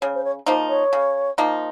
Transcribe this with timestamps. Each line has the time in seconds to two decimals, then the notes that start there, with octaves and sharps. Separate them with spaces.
0.02 C#3 C#5
0.15 C5
0.24 C#5
0.46 F3 A#3 D#4 C5
0.69 C#5
0.93 C#3
1.38 F3 A#3 D#4